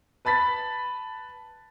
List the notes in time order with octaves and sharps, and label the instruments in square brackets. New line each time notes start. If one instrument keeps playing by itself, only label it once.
[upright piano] B4 A5 B5 A6 B6